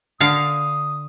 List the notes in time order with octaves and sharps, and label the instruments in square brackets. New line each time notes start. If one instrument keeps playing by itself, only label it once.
[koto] D3 F5 [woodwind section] D#6